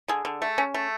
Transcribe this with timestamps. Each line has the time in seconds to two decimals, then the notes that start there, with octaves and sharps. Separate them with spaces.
0.08 D3 G#4
0.25 D3
0.42 A3
0.58 C#4
0.74 A3